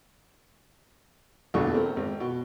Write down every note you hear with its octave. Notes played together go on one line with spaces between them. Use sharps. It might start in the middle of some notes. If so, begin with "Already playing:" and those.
A#1 E2 B2 D3 C#6
A3 C4 A#4
G#1 C4
B2